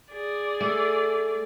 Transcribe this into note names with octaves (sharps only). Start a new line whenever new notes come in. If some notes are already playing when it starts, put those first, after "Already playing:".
G#4 D5
A3